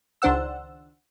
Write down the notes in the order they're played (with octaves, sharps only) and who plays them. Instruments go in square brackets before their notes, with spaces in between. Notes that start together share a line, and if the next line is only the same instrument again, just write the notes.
[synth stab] C#2 D#3 D4 C5 F#5 E6